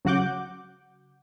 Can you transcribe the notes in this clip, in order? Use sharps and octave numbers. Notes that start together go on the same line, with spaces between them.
C#3 F#3 F#4 F#5 D6 G6